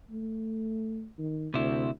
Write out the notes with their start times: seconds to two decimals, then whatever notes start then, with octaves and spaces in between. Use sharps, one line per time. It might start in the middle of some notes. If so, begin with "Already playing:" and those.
0.11 A3
1.18 D#3
1.54 D2 C3 E4